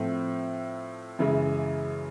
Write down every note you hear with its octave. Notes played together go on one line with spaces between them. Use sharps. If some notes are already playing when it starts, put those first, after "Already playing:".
Already playing: A2 F3 A3 C4
F#2 C#3 E3 G#3